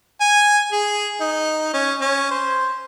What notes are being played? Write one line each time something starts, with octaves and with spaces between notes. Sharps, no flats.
G#5
G#4
D#4
C#4
C#4
C5